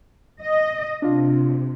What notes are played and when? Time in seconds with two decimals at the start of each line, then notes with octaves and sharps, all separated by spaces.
0.43 D#5
1.02 C3 D4 F4